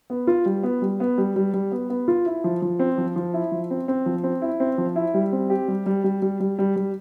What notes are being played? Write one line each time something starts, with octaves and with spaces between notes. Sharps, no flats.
B3
F4
G3
B3
G3
B3
G3
G3
G3
B3
B3
F4
E4
F3
F3
C4
F3
F3
E4
F3
C4
C4
F3
C4
E4
C4
F3
E4
G3
C4
G4
G3
G3
G3
G3
G3
G3
G3